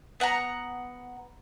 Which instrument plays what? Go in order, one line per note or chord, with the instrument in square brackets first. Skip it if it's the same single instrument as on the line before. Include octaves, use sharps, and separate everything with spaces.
[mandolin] B3 F#5 G5 A#5